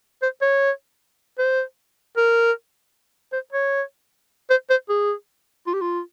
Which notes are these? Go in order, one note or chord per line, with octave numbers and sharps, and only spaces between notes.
C5
C#5
C5
A#4
C5
C#5
C5
C5
G#4
F4
G4
F4